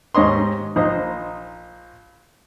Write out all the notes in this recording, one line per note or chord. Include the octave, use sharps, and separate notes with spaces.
D#2 G#2 C#5 D#5 C6
A#1 D#4 C5 D#5